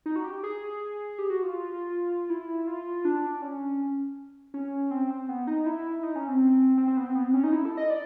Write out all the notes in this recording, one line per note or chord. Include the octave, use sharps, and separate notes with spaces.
D#4
F#4
G4
G#4
G4
F#4
F4
E4
F4
D4
C#4
C#4
C4
C4
B3
D#4
E4
D#4
C#4
C4
C4
C4
B3
C4
B3
C4
C#4
D#4
E4
A4
D#5
D5